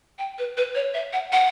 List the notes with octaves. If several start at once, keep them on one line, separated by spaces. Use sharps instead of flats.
G5
B4
B4
C#5
E5
F#5
F#5